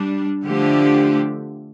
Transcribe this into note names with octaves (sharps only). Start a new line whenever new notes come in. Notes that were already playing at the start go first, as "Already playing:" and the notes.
Already playing: G3 D4
D3 F3 A3 D4 G4